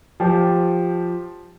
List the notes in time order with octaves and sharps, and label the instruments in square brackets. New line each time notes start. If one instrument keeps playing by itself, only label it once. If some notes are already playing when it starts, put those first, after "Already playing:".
[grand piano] F3 G4